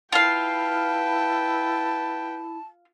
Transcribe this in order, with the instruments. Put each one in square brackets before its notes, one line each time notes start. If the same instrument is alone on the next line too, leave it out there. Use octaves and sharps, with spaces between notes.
[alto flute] E4 [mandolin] F4 F5 [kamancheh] B4 G5 [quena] A5